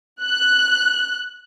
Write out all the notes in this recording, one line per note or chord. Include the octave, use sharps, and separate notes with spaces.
F#6